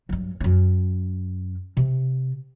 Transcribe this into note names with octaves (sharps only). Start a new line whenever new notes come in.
G2 F#3
F#2 C#4
C3